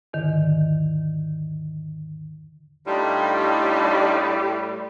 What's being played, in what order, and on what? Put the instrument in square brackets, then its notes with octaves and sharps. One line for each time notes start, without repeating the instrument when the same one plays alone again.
[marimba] E2 G#2 D3 D#3
[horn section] A2 G3 [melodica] D4 D#4 F4